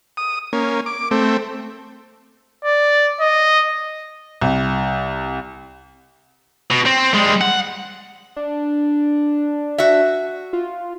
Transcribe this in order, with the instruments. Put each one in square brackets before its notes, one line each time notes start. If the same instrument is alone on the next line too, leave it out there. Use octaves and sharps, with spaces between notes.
[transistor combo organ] D#6
A#3 C#4
D6
A3 C4
[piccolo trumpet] D5
D#5
[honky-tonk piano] C2
[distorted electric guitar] B2
C4
G3 G#3
F#5
[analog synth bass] D4
[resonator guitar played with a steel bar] F#4 E5
[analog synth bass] F4